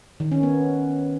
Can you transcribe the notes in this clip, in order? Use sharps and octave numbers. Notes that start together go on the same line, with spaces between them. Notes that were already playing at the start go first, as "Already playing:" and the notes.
D#3
C#4
B3